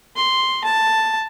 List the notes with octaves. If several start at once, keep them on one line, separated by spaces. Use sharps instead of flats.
C6
A5